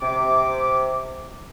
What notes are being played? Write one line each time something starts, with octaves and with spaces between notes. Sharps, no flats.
C3 D6